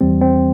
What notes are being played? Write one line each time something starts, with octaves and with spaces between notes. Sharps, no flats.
E2 E3 G3 C4
C4